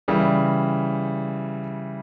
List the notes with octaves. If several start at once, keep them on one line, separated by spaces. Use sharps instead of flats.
C#3 E3 G3